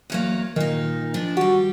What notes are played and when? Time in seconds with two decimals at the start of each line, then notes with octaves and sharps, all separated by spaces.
0.10 E2 F#3 A#3
0.56 A#2 D#3 D#4 A#4 D#5
1.14 F3 D4
1.37 G3 F#4 G4